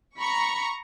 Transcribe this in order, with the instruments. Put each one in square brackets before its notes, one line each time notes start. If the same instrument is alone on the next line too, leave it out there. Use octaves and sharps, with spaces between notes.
[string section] A#5 C#6 [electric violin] B5